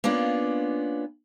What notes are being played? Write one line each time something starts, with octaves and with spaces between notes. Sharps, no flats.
A#3 B3 C#4 D4 F4